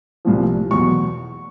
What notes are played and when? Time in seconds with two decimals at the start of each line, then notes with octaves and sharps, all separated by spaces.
0.25 C2 A#2 F3
0.71 E2 B2 F#3 C#6